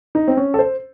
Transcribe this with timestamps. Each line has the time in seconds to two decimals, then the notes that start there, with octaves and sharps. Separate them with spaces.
0.15 D#4
0.28 C4
0.37 C#4
0.54 A4
0.59 C5